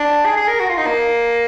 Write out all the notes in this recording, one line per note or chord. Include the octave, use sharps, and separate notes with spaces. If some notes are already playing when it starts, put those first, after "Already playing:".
Already playing: D4
G#4
G#4
A#4
F#4
F4
D#4
A#3